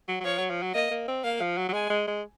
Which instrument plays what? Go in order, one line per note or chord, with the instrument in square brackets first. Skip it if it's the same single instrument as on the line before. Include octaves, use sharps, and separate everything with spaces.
[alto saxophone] F#3
F#3
[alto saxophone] F3 [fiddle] C#5
[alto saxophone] F#3
F3
F#3
[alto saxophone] A#3 [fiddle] D#5
[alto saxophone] A#3
C4
[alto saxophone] A#3 [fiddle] F5
[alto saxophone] F3
F#3
F#3
[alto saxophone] G#3 [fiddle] G#5
[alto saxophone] G#3
G#3